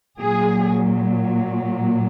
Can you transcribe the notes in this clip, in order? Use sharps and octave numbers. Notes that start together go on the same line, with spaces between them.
A#2 F#3 G#4